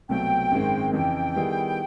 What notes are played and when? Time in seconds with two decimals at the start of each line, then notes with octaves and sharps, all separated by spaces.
0.09 C2 B2 F#3 A3 C4 G5
0.52 G#1 F#2 D#3 G#3 C4
0.93 F2 C#3 E3 G5
1.36 D#3 G3 B3 E4 G#4